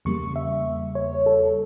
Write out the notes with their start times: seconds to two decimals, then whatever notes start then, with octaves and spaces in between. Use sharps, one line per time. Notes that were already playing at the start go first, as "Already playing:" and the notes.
0.05 E2 C#3 G3 A#3 C#6
0.36 E5
0.95 C#5
1.26 A4